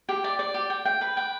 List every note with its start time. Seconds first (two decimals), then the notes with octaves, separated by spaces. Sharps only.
0.09 G4
0.24 D5
0.39 D5
0.54 G4
0.70 G5
0.85 G5
1.01 B4
1.17 G5